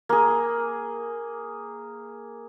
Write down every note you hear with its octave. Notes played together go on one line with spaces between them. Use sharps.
A#3 G#4